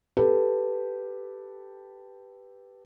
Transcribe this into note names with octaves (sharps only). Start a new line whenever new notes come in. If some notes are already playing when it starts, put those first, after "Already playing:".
G4 A4 B4